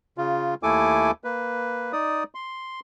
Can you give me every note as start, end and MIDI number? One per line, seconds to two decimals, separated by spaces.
0.18 0.54 49
0.18 0.54 65
0.63 1.11 39
0.63 1.11 57
0.63 1.11 64
0.63 1.11 69
0.63 1.11 80
0.63 1.11 86
1.24 1.92 58
1.24 1.92 71
1.93 2.24 63
1.93 2.24 74
1.93 2.24 87
2.35 2.80 84